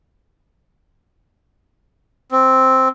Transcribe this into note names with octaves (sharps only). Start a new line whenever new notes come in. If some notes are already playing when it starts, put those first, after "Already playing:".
C4